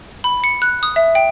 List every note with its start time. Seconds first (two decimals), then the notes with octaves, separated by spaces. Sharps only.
0.24 B5
0.44 C#7
0.62 F#6
0.83 D#6
0.96 E5
1.15 G5